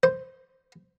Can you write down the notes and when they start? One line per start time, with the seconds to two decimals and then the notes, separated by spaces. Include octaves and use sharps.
0.03 C5